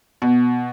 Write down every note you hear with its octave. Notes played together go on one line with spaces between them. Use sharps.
B2